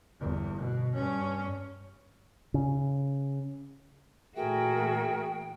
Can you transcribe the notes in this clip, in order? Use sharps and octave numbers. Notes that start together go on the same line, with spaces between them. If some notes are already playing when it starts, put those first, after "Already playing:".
G1 E2
B2
G2 C#4
C#3
A#2 E3 A3 F#4 G#4 A#4 E5 G5